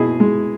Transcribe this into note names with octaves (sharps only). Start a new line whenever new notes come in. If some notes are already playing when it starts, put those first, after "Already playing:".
Already playing: B2 E4 G#4
G#3